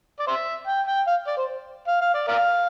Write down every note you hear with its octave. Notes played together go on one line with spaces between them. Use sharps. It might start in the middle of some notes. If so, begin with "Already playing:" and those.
D5
C5 E5
G5
G5
F5
D5
C5
F5
F5
D5
A#4 D5 F5